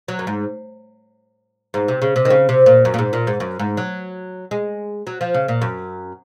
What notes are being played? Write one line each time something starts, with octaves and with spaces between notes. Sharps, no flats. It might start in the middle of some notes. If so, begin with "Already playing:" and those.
F#3
F#2
G#2
G#2
C3
C#3
C3
D#3
C#3
C3
A#2
F#2
A#2
G#2
A#2
G#2
F#2
G#2
F#3
G#3
F#3
F3
C#3
A#2
F#2